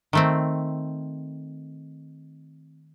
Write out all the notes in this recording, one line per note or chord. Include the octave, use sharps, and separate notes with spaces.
D#3 A3 C4